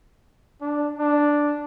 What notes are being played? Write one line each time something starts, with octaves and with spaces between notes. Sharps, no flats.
D4
D4